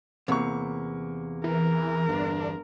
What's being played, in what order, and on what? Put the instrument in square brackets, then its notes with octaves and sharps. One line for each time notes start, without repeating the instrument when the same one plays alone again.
[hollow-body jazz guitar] E2 C3 [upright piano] A#3 C#6
[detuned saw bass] E3 [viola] A#4
[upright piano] G1 [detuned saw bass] D4